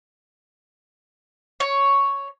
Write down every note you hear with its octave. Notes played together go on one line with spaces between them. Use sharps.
C#5